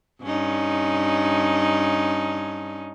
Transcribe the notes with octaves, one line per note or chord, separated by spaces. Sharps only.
G2 C#4 D#4